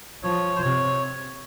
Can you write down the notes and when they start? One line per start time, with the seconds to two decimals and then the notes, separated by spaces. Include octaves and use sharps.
0.23 F3 C#5
0.56 C5
0.62 C3 C#5